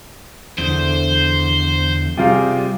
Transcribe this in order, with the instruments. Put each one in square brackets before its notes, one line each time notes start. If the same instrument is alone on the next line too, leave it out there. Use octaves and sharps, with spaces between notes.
[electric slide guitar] E2 D3 [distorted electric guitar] C5
[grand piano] C3 F4 G#4 [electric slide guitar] G3